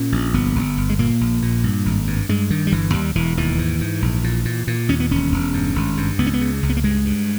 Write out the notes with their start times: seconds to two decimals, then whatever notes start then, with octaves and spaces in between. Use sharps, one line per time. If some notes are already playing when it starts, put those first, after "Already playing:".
Already playing: A#2 C#4
0.12 A#1
0.34 G1 B3
0.55 G1
0.77 G1
0.90 G#3
0.99 A#2 A#3
1.21 A#1
1.42 A#2
1.64 G2
1.86 G#1
2.07 G2
2.29 G2 G#3
2.50 G2 D#3
2.67 G3
2.72 G1 E3
2.93 D#2 G3
3.15 E1 E3
3.37 D#2 E3
3.59 G#2
3.80 G#2
4.02 A#1
4.24 A#2
4.45 A#2
4.67 A#2
4.89 D#2 C#4
5.00 B3
5.11 E1 C#4
5.32 E1
5.54 G2
5.76 G#1
5.97 G2
6.19 C#2 B3
6.27 C#4
6.34 B3
6.41 C#3
6.63 C#2
6.69 B3
6.77 A#3
6.84 G2 G#3
7.05 G2